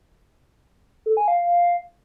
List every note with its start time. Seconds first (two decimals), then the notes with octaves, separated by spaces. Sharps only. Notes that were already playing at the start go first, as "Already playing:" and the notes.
1.06 A4
1.17 G#5
1.28 F5